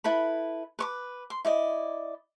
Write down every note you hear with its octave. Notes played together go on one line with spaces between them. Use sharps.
E4 A4 B4 B5
B4 C#6 D6
C6
E4 D5 D#5